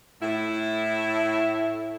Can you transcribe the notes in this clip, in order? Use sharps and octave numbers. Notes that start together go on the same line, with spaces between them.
A2 E4